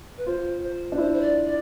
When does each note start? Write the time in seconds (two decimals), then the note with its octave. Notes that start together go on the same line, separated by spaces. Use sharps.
0.17 B4
0.26 F4 C5
0.62 C5
0.92 D4
0.98 E4 C5
1.13 C5
1.21 D5
1.45 D5